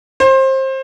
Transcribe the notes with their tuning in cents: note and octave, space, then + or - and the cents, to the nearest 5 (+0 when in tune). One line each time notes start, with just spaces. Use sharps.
C5 +25